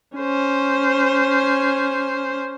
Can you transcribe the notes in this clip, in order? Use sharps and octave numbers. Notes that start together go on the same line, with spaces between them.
C#4 C5